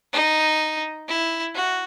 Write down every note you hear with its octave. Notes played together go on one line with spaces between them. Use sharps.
D#4
E4
F#4